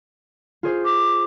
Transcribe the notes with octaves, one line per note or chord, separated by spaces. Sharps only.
F4 G#4 C5
D6